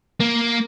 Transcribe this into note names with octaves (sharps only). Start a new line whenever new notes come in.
A#3